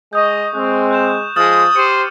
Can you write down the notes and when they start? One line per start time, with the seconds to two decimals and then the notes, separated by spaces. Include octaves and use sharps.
0.13 G#3 D#5 C#6 D#6 G6
0.55 G#3 C4 F#6
0.91 F#6 G6 E7
1.36 F3 G#3 D#6 F6 A6 F#7
1.75 G4 C5 D6 C#7 D#7